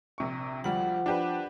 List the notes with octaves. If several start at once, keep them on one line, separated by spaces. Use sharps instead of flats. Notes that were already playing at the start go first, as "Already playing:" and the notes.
A#1 C3 C#6
D2 F3 G3 F#5
D4 G4 B4